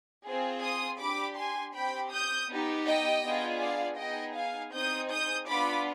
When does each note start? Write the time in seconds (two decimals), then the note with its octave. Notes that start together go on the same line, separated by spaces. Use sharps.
0.25 C4 F4 G#4
0.62 C6 D#6
1.00 D4 G4 B5 D6
1.37 G#5 C6
1.74 C4 G4 G5 B5
2.11 D#6 G6
2.49 B3 D#4 G4
2.86 D#5 G5
3.24 B3 D4 F4 G#4
3.61 D5 F5
3.98 B3 D#4 G#4 D#5 G5
4.36 F5 G#5
4.73 C4 D#4 G#4 D#6 G6
5.10 D#6 G6
5.48 B3 D4 F4 B5 D6